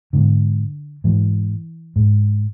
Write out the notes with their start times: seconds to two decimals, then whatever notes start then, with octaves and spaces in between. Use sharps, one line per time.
0.13 G#2 D3
1.04 G#2 E3
1.96 G#2